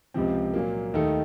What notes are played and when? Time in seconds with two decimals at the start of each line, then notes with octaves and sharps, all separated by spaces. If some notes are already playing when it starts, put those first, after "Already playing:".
0.14 C#2 C3 F3 C4
0.54 A#2 F#3 A#3
0.94 D#2 D#3 A3 D#4 A4